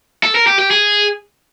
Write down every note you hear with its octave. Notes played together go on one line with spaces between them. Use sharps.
A4
A#4
G4
G4
G#4